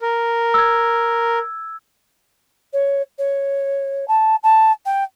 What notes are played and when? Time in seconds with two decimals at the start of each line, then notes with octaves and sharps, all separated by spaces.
0.01 A#4
0.54 E6 G#6
2.73 C#5
3.18 C#5
4.08 A5
4.43 A5
4.85 G5